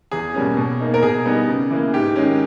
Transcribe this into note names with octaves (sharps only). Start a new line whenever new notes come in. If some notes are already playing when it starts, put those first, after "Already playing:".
E2 G#4
B2 G3 A#3 C#4
B2
A#3 D#4
A#4
B2 G#4
G3 B3 D#4
C#3
E3 A#3
G#2 G4
D#3 G#3 C#4